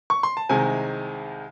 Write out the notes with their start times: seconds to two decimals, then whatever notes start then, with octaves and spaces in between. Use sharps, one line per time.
0.10 C#6
0.23 C6
0.37 A5
0.49 C2 C3 D#3 G#3 G#5